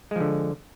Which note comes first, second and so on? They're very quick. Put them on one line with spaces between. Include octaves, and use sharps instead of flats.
G#3 F3 D3